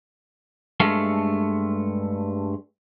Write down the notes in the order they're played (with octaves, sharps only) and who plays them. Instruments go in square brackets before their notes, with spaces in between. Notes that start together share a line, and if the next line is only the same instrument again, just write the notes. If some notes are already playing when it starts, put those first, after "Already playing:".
[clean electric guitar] G2 G#3 A3 A4 F5